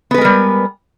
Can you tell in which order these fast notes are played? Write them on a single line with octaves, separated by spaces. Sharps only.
B3 B4 G#3 A#4 G3